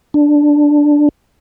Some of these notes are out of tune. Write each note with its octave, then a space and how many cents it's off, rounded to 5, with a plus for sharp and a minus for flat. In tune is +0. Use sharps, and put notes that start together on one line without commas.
D4 +0